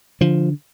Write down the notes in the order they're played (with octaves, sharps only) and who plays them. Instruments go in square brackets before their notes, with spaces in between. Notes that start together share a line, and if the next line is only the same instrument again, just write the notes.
[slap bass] D3 F3